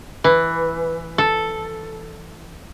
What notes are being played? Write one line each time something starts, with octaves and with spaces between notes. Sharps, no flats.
E3
A4